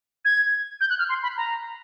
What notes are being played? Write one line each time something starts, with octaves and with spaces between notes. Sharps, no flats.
G#6
G6
F#6
F6
C6
B5
A#5